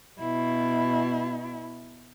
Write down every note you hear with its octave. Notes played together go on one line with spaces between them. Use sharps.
B2 E4